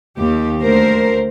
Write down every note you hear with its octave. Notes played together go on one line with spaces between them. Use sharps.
D#2 G4
D2 A#4 C5